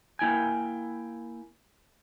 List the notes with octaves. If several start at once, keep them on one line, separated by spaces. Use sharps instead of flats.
A#3 E4 G5 G#5